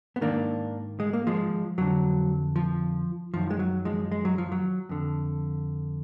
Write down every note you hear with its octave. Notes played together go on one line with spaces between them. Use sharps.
B3
G#2 D#3 A#3 D4
G#3
A#3
F3 G#3
F2 D3 F#3
F3
F#2 D#3 F3
G#3
F#3
F3 G#3
G#3
F#3
F3
F#3
F2 D3